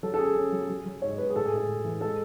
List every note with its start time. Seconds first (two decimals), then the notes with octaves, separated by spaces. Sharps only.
0.03 F#3 A4
0.14 A4
0.18 C#4 G#4
0.36 C#4
0.52 F#3
0.69 F#3
0.86 F#3
1.02 G#2 C#5
1.18 G#2 B4
1.30 G#4
1.36 A2 A4
1.46 G#4
1.52 A2 A4
1.68 A2
1.84 E3
2.01 G#3 A4